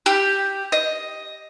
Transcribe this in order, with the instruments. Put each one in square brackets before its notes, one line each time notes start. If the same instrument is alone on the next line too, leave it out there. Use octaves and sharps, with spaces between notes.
[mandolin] G4
D#5